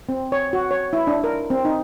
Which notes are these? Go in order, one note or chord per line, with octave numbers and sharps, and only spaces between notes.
C4
C#5
F#4
C#5
E4
D4
A#4
C4
D#4